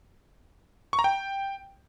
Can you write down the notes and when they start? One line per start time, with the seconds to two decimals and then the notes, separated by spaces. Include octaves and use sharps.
0.93 C#6
0.99 A#5
1.04 G5